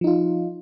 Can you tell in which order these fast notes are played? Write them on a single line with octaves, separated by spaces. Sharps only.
F3 D#4 F4